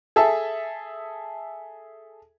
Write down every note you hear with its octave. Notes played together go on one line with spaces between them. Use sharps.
G#4 A4 E5 A5